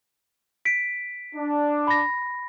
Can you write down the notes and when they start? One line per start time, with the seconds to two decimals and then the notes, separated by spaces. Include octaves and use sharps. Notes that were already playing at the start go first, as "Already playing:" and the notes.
0.65 B6 D7
1.34 D4
1.87 B5 A#6